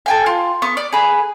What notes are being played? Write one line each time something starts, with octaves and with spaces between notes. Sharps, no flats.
A4 G5 G#5
F4
B3 C#6
D5
G#4 B4